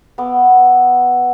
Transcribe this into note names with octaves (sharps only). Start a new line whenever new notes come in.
B3 D6 E6